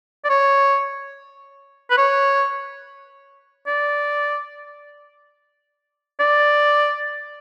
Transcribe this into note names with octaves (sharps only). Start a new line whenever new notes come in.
D5
C#5
B4
C#5
D5
D5